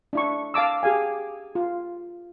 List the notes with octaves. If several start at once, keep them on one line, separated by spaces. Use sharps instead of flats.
D4 E4 C#6
F5 A5 D6 E6
G4 G#4 F5 G#5
F4